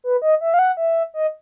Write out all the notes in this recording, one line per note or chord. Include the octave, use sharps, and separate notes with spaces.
B4
D#5
E5
F5
F#5
E5
D#5